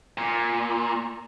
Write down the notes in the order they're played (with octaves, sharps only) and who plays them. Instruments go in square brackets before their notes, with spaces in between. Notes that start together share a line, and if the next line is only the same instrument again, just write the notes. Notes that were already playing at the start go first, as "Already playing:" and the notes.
[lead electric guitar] A#2